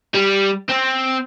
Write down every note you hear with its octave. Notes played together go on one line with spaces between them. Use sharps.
G3
C4